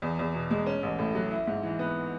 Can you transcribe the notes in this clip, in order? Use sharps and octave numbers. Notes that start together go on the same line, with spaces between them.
E2
E2
B2
G#3
C#4
A1
A2
F#3
E4
G#2
E3
B3